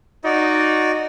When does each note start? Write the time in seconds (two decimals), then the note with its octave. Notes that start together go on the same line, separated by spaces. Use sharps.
0.25 D#4 F#4 D5